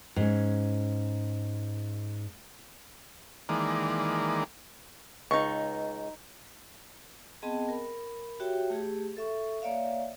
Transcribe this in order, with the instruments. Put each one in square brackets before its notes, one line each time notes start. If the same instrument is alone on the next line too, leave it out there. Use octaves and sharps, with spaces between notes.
[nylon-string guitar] G#2 C#4
[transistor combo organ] D#3 E3 G#3 A#3 D5
[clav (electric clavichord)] C#2 [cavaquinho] D#4 C#6
[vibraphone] B3 C4 G#4 D#5 G5 A5
A#4 B5
F#4 G4 C#5 E5 G5
A3 G4 G#4
A4 E5 C#6
A#3 C#5 D5 E5 F5